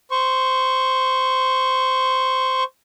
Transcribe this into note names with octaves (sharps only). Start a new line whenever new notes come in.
C5 C#6